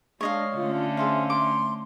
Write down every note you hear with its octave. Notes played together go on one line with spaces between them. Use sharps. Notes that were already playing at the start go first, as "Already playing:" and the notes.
G#3 D4 C#5 D#5 F5
D3 A3 C#4 F4
G#4 C5 E5 F5
C6 D6